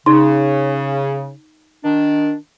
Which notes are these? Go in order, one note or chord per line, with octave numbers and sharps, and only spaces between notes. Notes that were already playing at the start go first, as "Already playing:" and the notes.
C#3 D#4 C6
D#3 D4